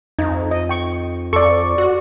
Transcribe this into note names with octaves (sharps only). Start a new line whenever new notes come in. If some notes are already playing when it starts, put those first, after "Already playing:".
F2 D#4
D#5
G5 C#6
F2 A4 D5 C6 C#6
F#4